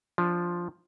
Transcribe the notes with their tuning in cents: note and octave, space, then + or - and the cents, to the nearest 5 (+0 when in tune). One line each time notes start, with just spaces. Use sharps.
F3 +0 D4 -15